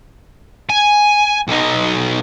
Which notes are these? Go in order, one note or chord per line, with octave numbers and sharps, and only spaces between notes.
G#5
B1 D#4